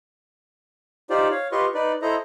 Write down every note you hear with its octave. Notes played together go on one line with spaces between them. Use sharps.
D#4 F4 G4 C5 D5
C#5 F5
F4 G4 B4 D#5 C6 C#6
D#4 B4 D5
E4 A4 C5 D#5 A#5